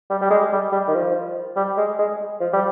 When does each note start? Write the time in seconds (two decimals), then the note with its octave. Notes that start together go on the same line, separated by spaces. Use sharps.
0.10 G3
0.21 G3
0.31 G#3
0.52 G3
0.72 G3
0.88 D#3
0.94 F3
1.56 G3
1.77 G#3
1.99 G#3
2.41 F3
2.53 G3